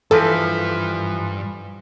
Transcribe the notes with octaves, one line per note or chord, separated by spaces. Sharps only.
G2 E3 F3 A4 B4